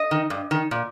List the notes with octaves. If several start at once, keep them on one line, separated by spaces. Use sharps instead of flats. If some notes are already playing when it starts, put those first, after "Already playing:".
Already playing: D#5
D#3
G2
D#3
A#2